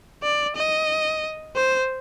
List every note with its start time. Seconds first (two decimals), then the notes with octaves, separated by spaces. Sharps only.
0.23 D5
0.56 D#5
1.56 C5